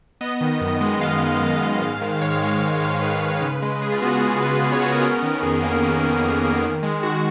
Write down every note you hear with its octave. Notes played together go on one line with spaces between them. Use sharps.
B3 D#5
D#3
F#2
G#3
B3 F5
D#3 F5
F#2 F5
G#3
G#2
D#3
G#2 C#5
G#3
G#2
D#3
G#2 B4
G#3
C#3
G#3
C#3 G#4
F4
B3 F#4
G#4
C#3 G#4
G#3 B4
C#3 B4
C#5
B3 F#4
A#4
C#4
D#3
F2 G#4
A#3
C#4
D#3
F2
A#3
D#3
G#3
D#3 F#4